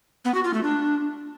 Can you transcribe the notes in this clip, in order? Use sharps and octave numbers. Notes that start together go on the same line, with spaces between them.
B3
F#4
F4
A3
D4